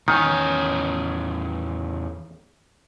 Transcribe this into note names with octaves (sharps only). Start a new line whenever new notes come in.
E2 D#3 C#4 G#5